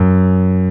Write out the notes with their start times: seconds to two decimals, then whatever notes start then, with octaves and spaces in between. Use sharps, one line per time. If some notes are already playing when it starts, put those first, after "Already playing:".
Already playing: F#2